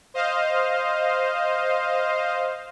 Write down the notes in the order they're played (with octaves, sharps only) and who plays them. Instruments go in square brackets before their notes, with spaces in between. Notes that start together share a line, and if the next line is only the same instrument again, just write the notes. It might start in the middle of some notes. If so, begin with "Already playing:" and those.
[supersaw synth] C5 D#5 F5